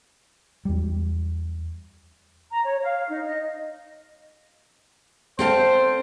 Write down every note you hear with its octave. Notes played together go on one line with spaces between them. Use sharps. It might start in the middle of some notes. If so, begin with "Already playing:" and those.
E2 G3
A#5
C#5
F5
D#4
D#5
C4 A4 C5 F5